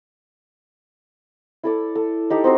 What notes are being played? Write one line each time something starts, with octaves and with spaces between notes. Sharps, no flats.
E4 A4 D5
A4
D#4 G4 A4 D5
C4 D#4 F#4 C5